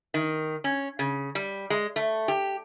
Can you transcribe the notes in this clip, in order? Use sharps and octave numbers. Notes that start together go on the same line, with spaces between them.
D#3
C#4
C#3
G3
G#3
A3
G4